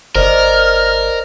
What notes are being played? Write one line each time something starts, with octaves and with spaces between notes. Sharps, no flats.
G1 A#4 C5 D5 D#5 F6